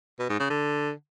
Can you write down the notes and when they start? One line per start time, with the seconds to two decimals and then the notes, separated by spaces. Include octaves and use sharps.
0.19 B2
0.29 G#2
0.40 C#3
0.50 D3